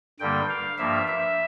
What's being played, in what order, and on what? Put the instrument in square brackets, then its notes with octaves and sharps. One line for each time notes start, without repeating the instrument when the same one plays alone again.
[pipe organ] G2 D3 G3 A#3 G5
F5
G2 F3 A#3 E5
E5